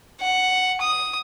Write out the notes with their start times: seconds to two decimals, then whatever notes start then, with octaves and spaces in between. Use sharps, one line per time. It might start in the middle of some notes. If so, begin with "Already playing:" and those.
0.21 F#5
0.81 D#6